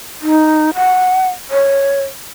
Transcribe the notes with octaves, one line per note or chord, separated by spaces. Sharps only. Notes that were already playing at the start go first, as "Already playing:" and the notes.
D#4
F#5
C#5